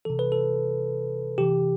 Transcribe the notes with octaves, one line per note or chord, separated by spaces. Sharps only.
C3 E3 A4
B4
A4
C3 E3 G4